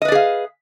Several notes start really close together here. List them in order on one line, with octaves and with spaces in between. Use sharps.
D#5 B4 D5 G#4 F5